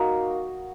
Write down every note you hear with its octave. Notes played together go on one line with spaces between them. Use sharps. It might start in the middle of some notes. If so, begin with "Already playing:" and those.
Already playing: A#3 D#4 F#4